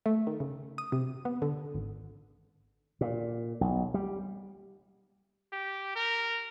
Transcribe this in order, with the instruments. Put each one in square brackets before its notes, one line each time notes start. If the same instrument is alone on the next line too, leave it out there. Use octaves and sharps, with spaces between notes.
[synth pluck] A3
D#3
C#3
D#6
C3
B3
D3
G#1
[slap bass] A#2
B1
G3
[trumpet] G4
A#4